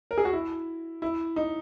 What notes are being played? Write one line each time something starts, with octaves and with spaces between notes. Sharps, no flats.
A#4
G#4
F#4
E4
E4
D#4